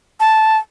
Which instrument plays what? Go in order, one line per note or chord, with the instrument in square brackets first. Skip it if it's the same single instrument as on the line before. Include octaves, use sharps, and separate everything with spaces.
[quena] A5